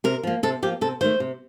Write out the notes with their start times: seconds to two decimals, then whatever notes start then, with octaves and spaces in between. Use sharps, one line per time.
0.04 C3 A#4
0.23 F3 A#3
0.43 C3 A4
0.62 F3 A#3 G4
0.81 C3 A4
1.01 D#3 A3 C5
1.20 C3